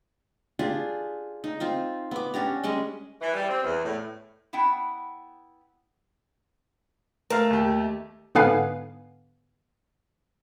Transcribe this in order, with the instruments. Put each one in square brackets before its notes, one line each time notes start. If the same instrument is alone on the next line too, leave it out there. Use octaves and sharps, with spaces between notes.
[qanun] D4 F4 G4 G#4
D#4
C4 F4 C5
B3 D6
C#4 D4 G4 A#5
G3 G#3 C#4 D#5
[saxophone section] E3
G3
C4
E2
A2
[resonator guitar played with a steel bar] B3 E4 F#5 G5
[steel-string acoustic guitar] A3 [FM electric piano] A#4 [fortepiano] F5 A#5
[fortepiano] D#2 G4
[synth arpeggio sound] G#2 D3 B3 B4 F5 G#5